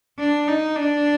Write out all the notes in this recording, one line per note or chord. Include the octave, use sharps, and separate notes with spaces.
D4
D#4
D4